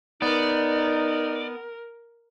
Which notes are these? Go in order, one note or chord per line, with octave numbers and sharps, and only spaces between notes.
B3 D#4 A#4 D5